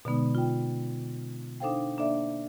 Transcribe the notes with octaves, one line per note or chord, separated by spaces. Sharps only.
B2 D3 G#3 B3 D#4
F4 G5
D4 D#4 A4 C5 F5 G5
A#3 D4 A4 D5 E5